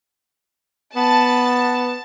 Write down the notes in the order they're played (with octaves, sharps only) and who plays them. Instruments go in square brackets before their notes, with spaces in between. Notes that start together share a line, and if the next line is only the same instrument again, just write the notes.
[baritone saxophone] B3 [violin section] A5